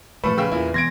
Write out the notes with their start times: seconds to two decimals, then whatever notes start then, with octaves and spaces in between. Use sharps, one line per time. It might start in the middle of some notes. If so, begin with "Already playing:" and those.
0.24 F#2 A#2 F3 A3 A4 B4 B5
0.38 C#3 G5 E6
0.52 E2 A#2 E4
0.74 B2 E3 B3 C6 G#6 A#6 D7